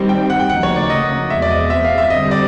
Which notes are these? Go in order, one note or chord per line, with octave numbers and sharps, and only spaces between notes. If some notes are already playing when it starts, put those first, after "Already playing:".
Already playing: D#3 G3 C4
G5
F#5
G5
D2 C#3 F3 A#3 D#4 F#5
C#5
D5
D#5
E2 B2 G#3 C4 E5
D5
D#5
E5
F5
E5
D3 G3 C4 D#5
D5